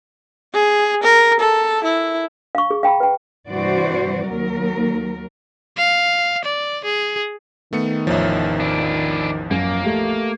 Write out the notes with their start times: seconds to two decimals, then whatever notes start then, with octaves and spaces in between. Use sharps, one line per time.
0.54 G#4
1.03 A#4
1.40 A4
1.84 E4
2.55 F5 C#6
2.71 G#4
2.83 F5 G5 A#5 B5
3.00 B4 G5
3.49 G2 C3 E3 F#4 C5 D5
4.24 D#2 F#3 A#4
5.77 F5
6.44 D5
6.84 G#4
7.73 D#3 A3 B3 C#7
8.07 A1 E2 F3 C#5 E5
8.60 D4 E4
9.51 F#2 A#3
9.84 A3 G4